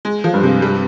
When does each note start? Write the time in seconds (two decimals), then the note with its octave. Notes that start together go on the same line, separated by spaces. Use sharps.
0.05 G#3
0.24 F3
0.34 G2
0.43 C3
0.62 G3